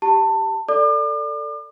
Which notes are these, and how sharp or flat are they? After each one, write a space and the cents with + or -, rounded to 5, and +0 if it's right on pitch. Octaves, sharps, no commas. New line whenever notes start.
G4 +0 A5 +25
A4 +15 D5 +0 D6 +40